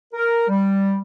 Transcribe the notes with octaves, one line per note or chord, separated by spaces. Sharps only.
A#4
G3